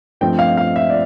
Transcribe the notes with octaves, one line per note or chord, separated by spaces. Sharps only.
G2 F3 A3 C4 G5
F5
F5
E5
D5